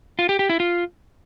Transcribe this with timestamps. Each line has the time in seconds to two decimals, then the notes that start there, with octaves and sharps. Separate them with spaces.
0.19 F4
0.29 G4
0.39 G4
0.49 E4
0.60 F4